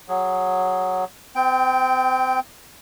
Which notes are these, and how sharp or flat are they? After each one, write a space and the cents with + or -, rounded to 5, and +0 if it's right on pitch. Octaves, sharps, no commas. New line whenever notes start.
F#3 +0 G#4 +0
C4 -30 G5 +0